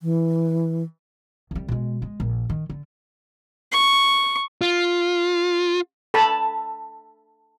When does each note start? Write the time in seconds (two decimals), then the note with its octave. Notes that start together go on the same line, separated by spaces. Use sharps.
0.01 E3
1.51 C2 G3
1.68 B2 G#3
2.02 G#3
2.20 A#1
2.50 D#3
2.70 D3
3.72 C#6
4.62 F4
6.14 A4 A5 B5